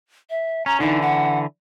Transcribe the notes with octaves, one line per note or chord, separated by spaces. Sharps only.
E5
C#4 A#5
D3 E3 D#4
F#5